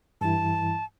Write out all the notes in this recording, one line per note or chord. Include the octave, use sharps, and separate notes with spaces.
G2 E3 E4 A5